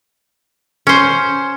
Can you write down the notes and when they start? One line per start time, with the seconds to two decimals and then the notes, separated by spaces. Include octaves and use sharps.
0.87 C#4 C5